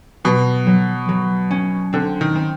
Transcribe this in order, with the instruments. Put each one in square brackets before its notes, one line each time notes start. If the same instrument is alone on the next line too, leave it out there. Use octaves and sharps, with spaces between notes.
[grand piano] B2 [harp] F#3
[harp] F#3
F#3
C#4
[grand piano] D3 [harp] C4
[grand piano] D#3
[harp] C4